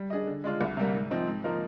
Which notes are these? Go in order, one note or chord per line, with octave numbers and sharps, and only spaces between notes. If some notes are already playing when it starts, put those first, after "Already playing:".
Already playing: G3
D4 G#4 D#5
D3
G#3 D4 F4
C2
C3 G3 A#3
G#2
F3 C4 D#4
G#2
F3 A#3 D#4 A#4